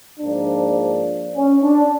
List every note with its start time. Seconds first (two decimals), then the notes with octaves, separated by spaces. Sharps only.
0.20 G#2 F3 A#3 D4
1.35 C#4
1.63 D4